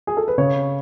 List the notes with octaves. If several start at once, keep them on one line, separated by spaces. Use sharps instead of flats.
G#4
A4
B4
C#3 C#5